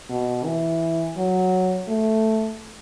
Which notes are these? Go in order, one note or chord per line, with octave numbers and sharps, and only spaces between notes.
B2
E3
F#3
A3